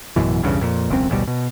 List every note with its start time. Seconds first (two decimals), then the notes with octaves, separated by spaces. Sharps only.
0.16 A1 F#2 B2 E3
0.42 B1 E2 G2 C#3
0.61 F2 A#2
0.89 E1 C#2 F#2 C4
1.10 A1 D2 B2 G3
1.27 B2